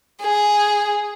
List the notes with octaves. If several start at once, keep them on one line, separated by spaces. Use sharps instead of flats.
G#4